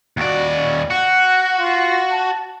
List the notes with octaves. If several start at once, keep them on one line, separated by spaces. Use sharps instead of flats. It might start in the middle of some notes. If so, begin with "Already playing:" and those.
D#2 F#4 D5
C#4
F#4 F#5
F4
A5